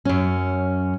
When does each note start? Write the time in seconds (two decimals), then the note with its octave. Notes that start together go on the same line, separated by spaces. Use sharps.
0.05 F#2 C#4